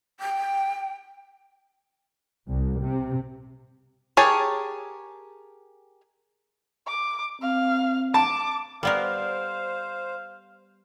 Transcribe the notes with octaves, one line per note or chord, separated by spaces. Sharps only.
G5
C2
C3
G4 G#4 A#4 C#5 A5
D6
C4 F5
A5 D6
G3 B3 A4 A#4 C5 D5 F5 F#5